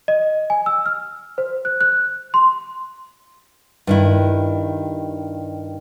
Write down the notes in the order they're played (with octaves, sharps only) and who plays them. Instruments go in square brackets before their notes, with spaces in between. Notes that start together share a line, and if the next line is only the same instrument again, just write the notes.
[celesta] D#5
G#5
E6
F6
C5
F#6
F#6
C6
[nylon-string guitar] G2 D#3 E4